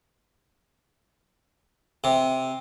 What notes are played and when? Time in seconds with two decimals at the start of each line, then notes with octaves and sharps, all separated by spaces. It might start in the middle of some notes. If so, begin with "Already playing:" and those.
2.04 C3